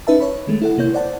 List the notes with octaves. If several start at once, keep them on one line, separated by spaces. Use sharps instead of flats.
C#4 D#4 B4 E5 A5
C#5 B5
D#3 G#3 A3
E4 A4 F#5
C3 A#3 E4 C#5 G6
C5 D5 F#5 A5